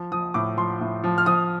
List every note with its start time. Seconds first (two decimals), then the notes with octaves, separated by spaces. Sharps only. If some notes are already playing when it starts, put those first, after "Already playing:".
Already playing: F3
0.12 F3 D#6
0.34 A2 D6
0.57 F3 C6
0.81 A2
1.04 F3
1.18 F6
1.26 F3 D#6